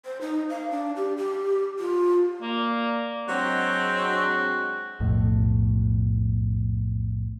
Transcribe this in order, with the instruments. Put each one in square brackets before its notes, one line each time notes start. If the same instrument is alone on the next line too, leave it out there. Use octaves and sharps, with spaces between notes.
[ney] C5
D#4
F5
D4
G4
G4
F4
[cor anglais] A#3 [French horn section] D5
[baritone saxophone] F#3 [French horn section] G#3 D4 [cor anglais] C4 [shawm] F#4
[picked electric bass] B1 F2 A2